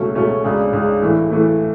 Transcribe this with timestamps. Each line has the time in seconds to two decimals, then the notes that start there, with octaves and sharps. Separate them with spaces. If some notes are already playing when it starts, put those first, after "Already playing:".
Already playing: C#2 B2 A3 C#4
0.15 C#2 B2 A3 C#4
0.44 C#2 C#3 G#3 D4 G#4
0.73 C#2 C#3 G#3 D4 G#4
1.02 A2 E3 A3
1.30 A2 E3 A3